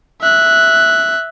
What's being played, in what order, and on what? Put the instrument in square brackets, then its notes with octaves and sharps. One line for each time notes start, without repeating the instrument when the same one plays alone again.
[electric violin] E5 F#6